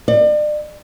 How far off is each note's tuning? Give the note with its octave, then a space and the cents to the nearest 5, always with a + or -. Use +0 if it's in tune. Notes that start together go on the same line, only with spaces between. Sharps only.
D5 +35